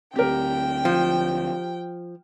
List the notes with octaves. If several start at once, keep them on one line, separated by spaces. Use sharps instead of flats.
D2 C4 G4 A#4 G5
F3